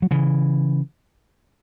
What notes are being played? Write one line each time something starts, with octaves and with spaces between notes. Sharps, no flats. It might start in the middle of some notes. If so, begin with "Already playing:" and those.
F#3
C#3 E3